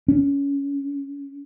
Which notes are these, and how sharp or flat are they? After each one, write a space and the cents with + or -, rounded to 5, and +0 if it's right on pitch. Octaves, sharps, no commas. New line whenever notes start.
C#4 +20